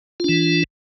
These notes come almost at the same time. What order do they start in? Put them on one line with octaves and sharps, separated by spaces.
F4 D4 E3